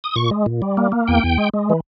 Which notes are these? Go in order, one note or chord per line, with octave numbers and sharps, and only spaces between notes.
D#6
A#2 C#6
G#3
A#2
G3
A#3
A#3
E2 G5
E2
G#3
G#3
E3